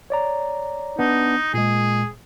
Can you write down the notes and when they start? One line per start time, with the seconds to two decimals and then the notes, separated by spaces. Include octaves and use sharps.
0.10 C#5 D5 A#5
0.99 B3 D4 D#4
1.54 A#2 G#3 G#4